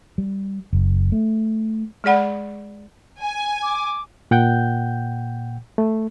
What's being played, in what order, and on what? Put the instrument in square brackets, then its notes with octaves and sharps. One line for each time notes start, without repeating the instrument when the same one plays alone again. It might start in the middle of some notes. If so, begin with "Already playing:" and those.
[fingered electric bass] G3
F#1
A3
[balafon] G#3 G#4 D5 F#5 B5
[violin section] G#5
[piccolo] D6
[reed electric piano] A#2 F#5 G5 G6
A3